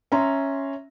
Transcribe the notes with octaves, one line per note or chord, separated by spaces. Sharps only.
C#4 E5 A#5 C6